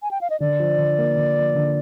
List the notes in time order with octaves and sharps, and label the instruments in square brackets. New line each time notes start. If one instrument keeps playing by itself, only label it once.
[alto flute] G#5
G5
F5
D#5
[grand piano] D3 [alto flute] D5
[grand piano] F3
D3
A#3
D3
F3
D3